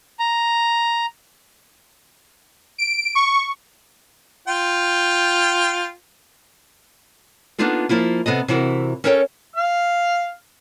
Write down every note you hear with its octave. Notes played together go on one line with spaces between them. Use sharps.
A#5
D7
C#6
F4 G5
A#3 B3 D4 D#4 F4 A4
F3 A#3 E4 F4
C3 B3 A4 D#5
C3 E3 E4 F#4 A#4
C#4 A4 A#4 C#5 F5 G5
F5 F6